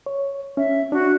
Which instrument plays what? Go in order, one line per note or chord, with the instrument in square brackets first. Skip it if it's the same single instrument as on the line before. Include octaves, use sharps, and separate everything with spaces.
[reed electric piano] C#5
[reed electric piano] C#4 [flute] E5
[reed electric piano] D4 [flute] F#4